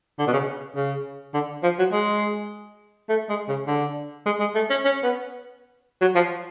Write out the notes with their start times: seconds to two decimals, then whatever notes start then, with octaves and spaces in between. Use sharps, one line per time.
0.18 D3
0.27 B2
0.33 C#3
0.76 C#3
1.34 D3
1.63 F3
1.79 F#3
1.92 G#3
3.09 A3
3.29 G#3
3.48 C#3
3.67 D3
4.26 G#3
4.40 G#3
4.55 A3
4.70 C#4
4.85 C#4
5.03 B3
6.01 F#3
6.15 F3